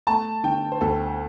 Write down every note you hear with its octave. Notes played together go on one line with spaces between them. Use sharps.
A3 A5
D3 G5
C5
D2 A4